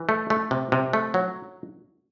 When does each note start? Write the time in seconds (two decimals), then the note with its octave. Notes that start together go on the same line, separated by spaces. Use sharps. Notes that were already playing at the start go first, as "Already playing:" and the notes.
Already playing: E3
0.09 A3
0.30 A3
0.51 C3
0.72 C3
0.93 A3
1.14 F#3